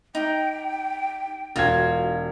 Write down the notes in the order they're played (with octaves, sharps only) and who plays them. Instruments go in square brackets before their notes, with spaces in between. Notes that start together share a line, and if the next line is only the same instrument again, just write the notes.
[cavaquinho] D#4 [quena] G5
[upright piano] E1 G#6 [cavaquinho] F4 F#4